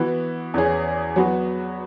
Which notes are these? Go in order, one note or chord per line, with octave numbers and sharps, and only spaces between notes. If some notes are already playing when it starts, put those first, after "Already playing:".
Already playing: E3 B3 F#4
E2 E3 C#4 G#4
F#3 B3 F#4